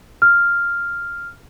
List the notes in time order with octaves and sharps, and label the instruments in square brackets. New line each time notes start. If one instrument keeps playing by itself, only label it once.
[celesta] F6